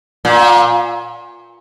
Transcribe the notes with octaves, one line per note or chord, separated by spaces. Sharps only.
A#2